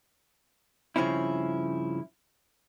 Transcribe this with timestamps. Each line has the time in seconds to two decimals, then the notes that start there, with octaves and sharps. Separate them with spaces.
0.96 G2 C#3 F3 C4 C#4 E4